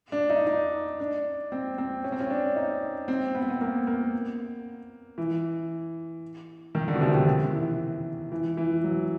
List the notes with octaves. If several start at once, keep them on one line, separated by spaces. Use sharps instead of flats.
D4
D#4
D4
D#4
D4
C4
C4
C#4
C4
C#4
D4
D#4
C4
B3
C4
B3
A#3
A#3
E3
D#3
D3
B2
C3
D#3
D3
D#3
E3
E3
E3
F#3